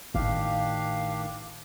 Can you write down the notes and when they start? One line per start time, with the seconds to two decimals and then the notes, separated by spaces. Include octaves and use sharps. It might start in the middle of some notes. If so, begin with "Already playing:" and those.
0.14 G#1 A2 D#3 D4 G4 F5